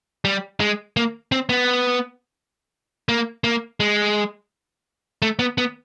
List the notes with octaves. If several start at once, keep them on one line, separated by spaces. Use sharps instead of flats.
G3
G#3
A#3
C4
B3
A#3
A#3
G#3
A3
B3
B3